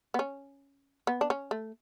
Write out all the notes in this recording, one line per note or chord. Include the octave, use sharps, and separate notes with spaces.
B3
C#4
B3
D4
C#4
A3